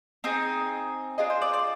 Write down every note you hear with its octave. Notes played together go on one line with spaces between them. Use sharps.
C4 D#4 G#4
D4 F4 G#4 D#5
C5
D5
D5